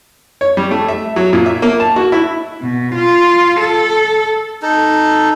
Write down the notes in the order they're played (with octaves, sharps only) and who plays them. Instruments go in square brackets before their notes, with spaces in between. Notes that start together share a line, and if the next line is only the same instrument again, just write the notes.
[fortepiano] C#5
G3
A3
E5
F#3
A#2
E5
A#3
A5
F#4
E4
[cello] B2
F4
A4
[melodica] D#4 A4